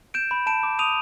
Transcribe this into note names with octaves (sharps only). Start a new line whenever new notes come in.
G6 D7 E7
B5
A5 D7 E7
D6
D#6 D#7 F7